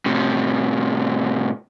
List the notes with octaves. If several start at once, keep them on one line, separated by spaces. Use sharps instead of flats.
A2 C3